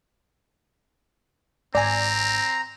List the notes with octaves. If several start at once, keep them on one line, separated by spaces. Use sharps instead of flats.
G#1 C4 D5 G#5 A#5